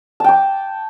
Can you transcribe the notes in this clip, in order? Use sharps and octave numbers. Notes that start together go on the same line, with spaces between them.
G5 A5 D6